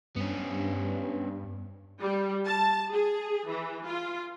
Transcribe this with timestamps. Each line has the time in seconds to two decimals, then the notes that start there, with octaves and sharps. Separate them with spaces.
0.16 G2 B3 C#4
2.01 G3
2.45 A5
2.92 G#4
3.49 E3
3.86 F4